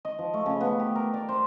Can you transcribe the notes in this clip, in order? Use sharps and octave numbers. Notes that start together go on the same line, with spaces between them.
D#5
F3
A3
C#3
B3
G4
A#4
D5
C5